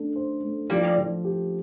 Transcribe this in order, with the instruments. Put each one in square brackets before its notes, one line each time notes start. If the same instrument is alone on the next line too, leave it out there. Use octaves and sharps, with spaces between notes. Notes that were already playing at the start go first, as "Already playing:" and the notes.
Already playing: [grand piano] A3 D4 A4
C5
A3
[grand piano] F3 [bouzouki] G3 A#3
[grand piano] F3
G4